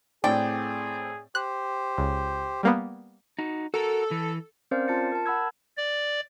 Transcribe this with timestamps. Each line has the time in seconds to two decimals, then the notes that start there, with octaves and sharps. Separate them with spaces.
0.24 A2 C4 G#4 D5 G5
1.35 G4 C5 F#6
1.98 C#2
2.63 G3 A#3 B3
3.39 D#4 F#4
3.74 F#4 A4 A#4
4.11 E3
4.71 C4 C#4 A#4 C5 D5 F5
4.88 F4 A5 A6 C#7
5.12 A#4 A5
5.26 F#5 B5 E6 G#6
5.77 D5